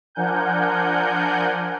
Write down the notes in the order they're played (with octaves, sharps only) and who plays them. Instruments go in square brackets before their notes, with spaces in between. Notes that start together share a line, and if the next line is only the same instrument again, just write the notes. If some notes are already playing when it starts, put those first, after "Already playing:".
[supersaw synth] F3 D4 A#4 F#5 G#5 G6